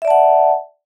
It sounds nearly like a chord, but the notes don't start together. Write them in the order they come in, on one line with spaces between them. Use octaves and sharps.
E5 D5 A5 F#5